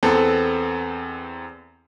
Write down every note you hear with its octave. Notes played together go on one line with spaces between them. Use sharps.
E2 B3 C4 A4